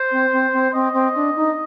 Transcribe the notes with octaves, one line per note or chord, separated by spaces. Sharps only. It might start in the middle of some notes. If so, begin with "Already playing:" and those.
Already playing: C5
C4
C4
C4
C4 D#5
C4
D4
D#4